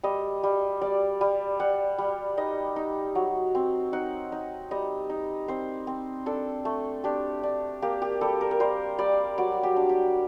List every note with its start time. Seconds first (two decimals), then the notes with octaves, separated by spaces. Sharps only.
0.03 G3 D#5
0.43 G3
0.81 G3 D5
1.21 G3
1.60 G3 F#5
1.98 G3
2.37 D#4 D#5
2.76 D#4
3.15 F#3
3.55 C4
3.93 D#4 F#5
4.32 D#4
4.71 G3 D#5
5.10 D#4
5.48 C4 C5
5.87 C4
6.26 D4 A4
6.65 A3
7.04 D4 G4
7.43 D4
7.82 A#3 G4
8.02 G4
8.21 G3 A4
8.41 A#4
8.51 A#4
8.60 G3 C5
8.98 G3 D5
9.38 F#3 D5
9.63 G4
9.76 D4
9.89 G4